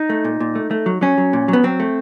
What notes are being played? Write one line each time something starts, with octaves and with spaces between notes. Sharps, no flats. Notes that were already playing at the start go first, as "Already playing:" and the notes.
Already playing: D#4
A3
A#2
A#2
A3
A3
F#3
F#3 C#4
F#3
A#2
F#3
B3
F#3 C4
A3